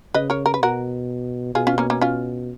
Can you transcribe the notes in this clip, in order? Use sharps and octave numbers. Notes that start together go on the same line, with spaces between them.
C#3 B4 D#5
A#4 C#5
A#4
B4
B2 F#4 A#4
B2 F4 G#4
C#4 F4
A#3 C#4
A#3 C#4
C#4 F4